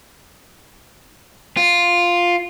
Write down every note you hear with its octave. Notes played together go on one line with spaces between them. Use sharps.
F4